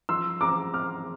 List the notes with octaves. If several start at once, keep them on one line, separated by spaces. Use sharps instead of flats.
F3 C6 E6
C4 A#5 D6
C4 D6 F6